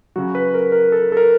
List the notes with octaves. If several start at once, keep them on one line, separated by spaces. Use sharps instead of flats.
C#3 F#3 F#4
B4
A#4
A#4
A4
A4
A#4